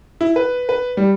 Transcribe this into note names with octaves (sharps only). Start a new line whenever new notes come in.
E4
B4
B4
G3